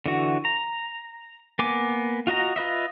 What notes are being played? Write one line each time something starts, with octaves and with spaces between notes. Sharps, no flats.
D3 E3 F#4
A#5
A#3 B3 G#5 D6
F4 F#4 D#5 A#5
F4 B4 D#5 E5